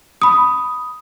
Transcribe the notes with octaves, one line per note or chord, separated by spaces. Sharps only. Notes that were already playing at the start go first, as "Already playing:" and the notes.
B5 D#6